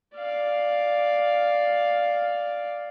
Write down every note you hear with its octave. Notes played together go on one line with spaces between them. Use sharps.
D5 F5